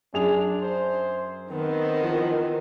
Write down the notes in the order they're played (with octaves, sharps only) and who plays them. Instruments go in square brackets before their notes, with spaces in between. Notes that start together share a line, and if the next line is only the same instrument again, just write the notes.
[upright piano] F#2 G#4 F7 [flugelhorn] D4
[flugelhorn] C5
[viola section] D#3 C4 [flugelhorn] B3
[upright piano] E3 F3